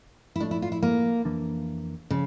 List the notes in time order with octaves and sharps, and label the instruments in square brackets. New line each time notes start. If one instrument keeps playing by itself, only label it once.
[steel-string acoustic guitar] E4
[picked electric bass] A2 F3 A3 [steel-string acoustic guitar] D4
[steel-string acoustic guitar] E4
F4
E4
A#3
[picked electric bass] F2 E3 A#3 D4
[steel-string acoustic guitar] C#3 [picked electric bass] F3